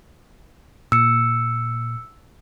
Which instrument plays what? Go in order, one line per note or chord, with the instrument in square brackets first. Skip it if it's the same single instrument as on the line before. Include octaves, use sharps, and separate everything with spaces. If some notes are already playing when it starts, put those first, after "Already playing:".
[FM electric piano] A#2 [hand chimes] E6 C#7